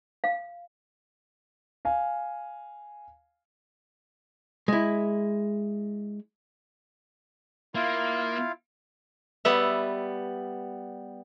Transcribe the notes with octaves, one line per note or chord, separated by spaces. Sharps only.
F5
F5 G#5
G#3 E4
A#3 E4 F4 F5
G3 B3 E5